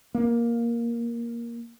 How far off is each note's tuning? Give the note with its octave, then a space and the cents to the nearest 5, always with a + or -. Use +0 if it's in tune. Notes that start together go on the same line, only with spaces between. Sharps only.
A#3 +10